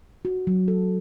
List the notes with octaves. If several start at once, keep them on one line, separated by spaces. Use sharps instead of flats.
F#4
F#3
A4